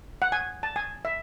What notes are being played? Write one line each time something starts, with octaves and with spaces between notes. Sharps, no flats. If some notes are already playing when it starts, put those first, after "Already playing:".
F#5
G#5
A5
G#5
E5